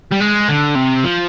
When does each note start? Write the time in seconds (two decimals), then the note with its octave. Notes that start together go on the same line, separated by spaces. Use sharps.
0.11 G3
0.20 G#3
0.48 D3
0.76 C3
1.05 F3